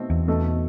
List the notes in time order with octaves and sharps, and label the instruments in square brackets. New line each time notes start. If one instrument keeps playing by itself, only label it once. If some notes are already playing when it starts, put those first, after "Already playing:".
Already playing: [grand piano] B2 A3 C4 D#4
[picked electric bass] E2
[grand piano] B2 A3 D#4 A4